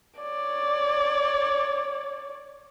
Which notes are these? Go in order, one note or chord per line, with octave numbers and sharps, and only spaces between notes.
C#5 D5